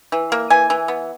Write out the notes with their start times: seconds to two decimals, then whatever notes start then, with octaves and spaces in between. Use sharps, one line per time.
0.12 E3
0.32 A#3
0.50 E3 G#5
0.70 E3
0.88 B3